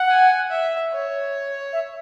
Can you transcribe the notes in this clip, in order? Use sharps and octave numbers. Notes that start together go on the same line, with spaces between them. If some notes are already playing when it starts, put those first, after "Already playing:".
Already playing: F#5
G#5
E5
C#5
E5